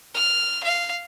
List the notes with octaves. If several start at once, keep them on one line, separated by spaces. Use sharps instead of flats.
F6
F5